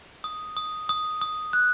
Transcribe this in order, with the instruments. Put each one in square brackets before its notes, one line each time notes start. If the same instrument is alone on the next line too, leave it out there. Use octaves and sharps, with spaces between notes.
[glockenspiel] D#6
D#6
D#6
D#6
F#6